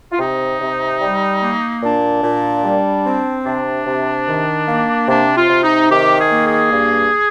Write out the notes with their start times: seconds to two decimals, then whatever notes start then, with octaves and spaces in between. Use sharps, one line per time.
0.12 F4
0.19 C3 D#4
0.60 C3
1.01 G3
1.42 A#3
1.82 A#2 D4
2.23 A#2
2.64 G3
3.05 C4
3.45 C3 D4
3.86 C3
4.27 D#3
4.68 A#3
5.08 C3 D4
5.36 F4
5.49 C3
5.63 D#4
5.89 D#3 G4
6.17 G#4
6.30 A#3
6.44 G#4
6.71 G2